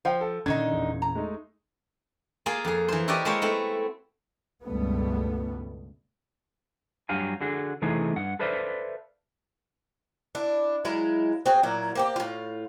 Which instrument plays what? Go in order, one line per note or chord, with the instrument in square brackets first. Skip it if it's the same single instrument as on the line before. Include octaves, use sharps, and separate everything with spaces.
[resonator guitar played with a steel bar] F3 [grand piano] C5 F5 G5
[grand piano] A4
[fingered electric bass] A#2 C#4 [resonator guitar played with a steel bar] D3 D#3 D#4 [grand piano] G#6
[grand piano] E1
[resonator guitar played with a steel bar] A#5
[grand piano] G#3 A3 D#4
[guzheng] A#3 F4 G#4 F5 G#5
F2 G#4
E3 C5
E4 F#4 G4 A#4 D5 D#5
G#3 A#3 C5 C#5
A3 B3 C4 E4
[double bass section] C#2 G2 B2 G3 A3 B3
[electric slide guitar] G2 F#3 G4 F5 G#5
D3 F#4 G#4
C3 E3 A3 D#4 G#4
G2 F#5
A4 B4 C5 D5 E5 F5
[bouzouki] D4 E4
F#3 G#3 E4 F4
C4 F#4 G#4
A#2 F#3 E4 F4
A#3 C4 G4
A2 F4